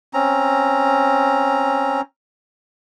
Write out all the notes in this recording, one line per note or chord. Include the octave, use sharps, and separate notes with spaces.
C4 C#4 A#5